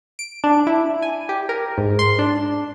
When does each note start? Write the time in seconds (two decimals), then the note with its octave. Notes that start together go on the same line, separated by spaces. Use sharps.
0.19 D7
0.44 D4
0.67 E4
1.02 G#5
1.29 G4
1.49 A#4
1.78 G#2
1.99 C6
2.19 D4